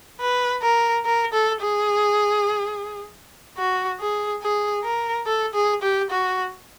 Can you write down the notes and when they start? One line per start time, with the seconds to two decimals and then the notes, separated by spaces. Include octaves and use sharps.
0.21 B4
0.63 A#4
1.05 A#4
1.33 A4
1.61 G#4
3.58 F#4
4.00 G#4
4.42 G#4
4.84 A#4
5.26 A4
5.54 G#4
5.82 G4
6.11 F#4